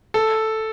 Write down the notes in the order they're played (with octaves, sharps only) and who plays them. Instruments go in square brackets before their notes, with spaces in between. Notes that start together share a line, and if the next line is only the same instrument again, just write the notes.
[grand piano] A4